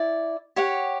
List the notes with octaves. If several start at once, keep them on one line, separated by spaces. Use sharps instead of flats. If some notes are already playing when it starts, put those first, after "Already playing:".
Already playing: E4 D5
G4 C#5 F#5